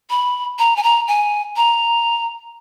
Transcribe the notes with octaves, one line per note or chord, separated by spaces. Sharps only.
B5
A#5
G#5
A#5
G#5
A#5